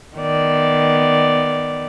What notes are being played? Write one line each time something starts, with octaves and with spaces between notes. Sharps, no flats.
D#3 B3 D5